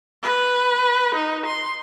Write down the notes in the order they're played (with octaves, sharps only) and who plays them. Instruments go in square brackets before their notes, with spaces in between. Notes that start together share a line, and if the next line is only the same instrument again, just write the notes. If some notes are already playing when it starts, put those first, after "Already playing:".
[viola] B4
D#4
C6